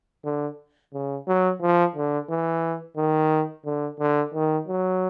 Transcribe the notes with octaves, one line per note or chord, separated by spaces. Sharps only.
D3
C#3
F#3
F3
D3
E3
D#3
D3
D3
D#3
F#3